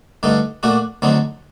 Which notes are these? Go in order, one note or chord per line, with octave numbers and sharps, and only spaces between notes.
G2 D3 A3 D#4
A#2 A3 D4 F#4
D2 D3 F#3 C4 D#4